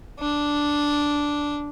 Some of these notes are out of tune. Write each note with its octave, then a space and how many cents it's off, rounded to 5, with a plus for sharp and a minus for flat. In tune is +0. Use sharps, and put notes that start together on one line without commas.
D4 -5